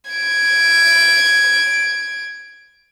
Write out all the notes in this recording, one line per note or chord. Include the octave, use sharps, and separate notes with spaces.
G#6 D7